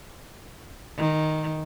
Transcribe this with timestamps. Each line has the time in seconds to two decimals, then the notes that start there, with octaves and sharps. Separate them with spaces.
0.98 D#3